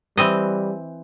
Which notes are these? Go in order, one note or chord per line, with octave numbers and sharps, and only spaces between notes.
E3 G3 C4 D#5